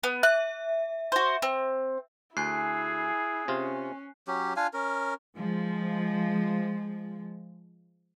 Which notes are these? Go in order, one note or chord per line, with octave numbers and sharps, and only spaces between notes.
B3
E5 F#6
F#4 C5
C4
D2 E4 G#4 G#5 F#6 C7
C3 C#4 F4
F#3 C#4 G4
D4 F4 F5 G#5
C#4 A#4
F3 G#3